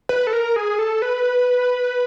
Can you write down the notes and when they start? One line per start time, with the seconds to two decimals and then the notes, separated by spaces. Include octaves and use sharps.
0.09 B4
0.27 A4
0.33 A#4
0.56 G#4
0.79 A4
1.02 B4